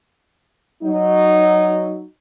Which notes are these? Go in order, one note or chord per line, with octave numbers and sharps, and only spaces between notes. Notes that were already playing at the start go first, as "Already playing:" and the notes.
F#3 D#4